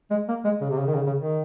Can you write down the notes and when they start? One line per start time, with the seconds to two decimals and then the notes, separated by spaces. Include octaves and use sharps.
0.10 G#3
0.28 A#3
0.44 G#3
0.61 C#3
0.70 C3
0.79 C#3
0.87 D#3
0.94 C#3
1.06 C#3
1.18 D#3